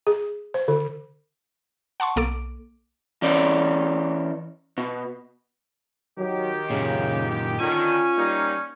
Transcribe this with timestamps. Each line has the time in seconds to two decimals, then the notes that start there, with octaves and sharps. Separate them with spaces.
0.07 G#4
0.54 C5
0.68 D3
2.00 F#5 A5 C6 C#6
2.16 B1 A#3 A4 D6 D7
3.22 E3 C#4 D5
4.78 B2
6.18 D#3 F#3 G4
6.70 F#2 A#2 C#3
7.60 D3 D#3 C#4 F4 G#5
8.17 G3 A#3 D#4